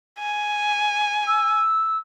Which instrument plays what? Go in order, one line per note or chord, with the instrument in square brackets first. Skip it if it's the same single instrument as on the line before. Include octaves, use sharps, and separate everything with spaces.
[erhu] G#5
[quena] E6